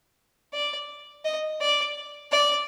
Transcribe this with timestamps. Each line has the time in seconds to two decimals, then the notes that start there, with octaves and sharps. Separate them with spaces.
0.53 D5
1.25 D#5
1.61 D5
2.32 D5